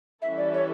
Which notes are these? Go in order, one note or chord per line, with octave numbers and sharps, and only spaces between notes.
E3 G3 C#4 E4 A4 E5
D5
C#5